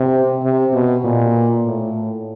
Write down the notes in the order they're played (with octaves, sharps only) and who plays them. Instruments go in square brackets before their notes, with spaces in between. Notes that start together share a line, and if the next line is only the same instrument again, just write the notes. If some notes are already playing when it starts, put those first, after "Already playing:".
Already playing: [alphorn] C3
C3
B2
A#2
A2